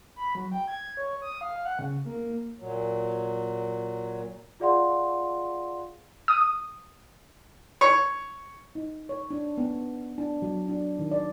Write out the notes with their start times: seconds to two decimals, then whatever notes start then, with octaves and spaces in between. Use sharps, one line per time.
0.16 B5
0.35 F#3
0.52 G5
0.68 G#6
0.97 C#5
1.22 D#6
1.41 F5
1.65 F#5
1.79 C#3
2.05 A#3
2.58 A#2 F#3
4.60 F4 G#4 D5 F5 F#5 C6
6.28 D#6
7.81 C#5
8.75 D#4
9.09 C#5
9.31 D4
9.58 B3
10.18 D4
10.42 F#3
10.68 D4
10.99 D#3
11.11 D5